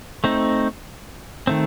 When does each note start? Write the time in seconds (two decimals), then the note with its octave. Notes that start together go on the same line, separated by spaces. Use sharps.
0.24 A3 C4 D#4
1.47 D#3 A3 C4